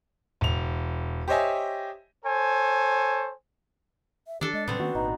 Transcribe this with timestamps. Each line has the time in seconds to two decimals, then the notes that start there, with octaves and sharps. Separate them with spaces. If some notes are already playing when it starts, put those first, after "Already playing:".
0.41 E1 F7
1.28 G4 C5 C#5 D#5 E5 G#5
2.25 A4 C5 C#5 G#5
4.27 E5
4.41 D#3 E3 D4 G4 A4
4.53 G#3 D#5
4.68 A2 C3 F#3 B3 C4 B4
4.79 D#3 A#3 C#4 F#4
4.95 G#1 A#2 D#4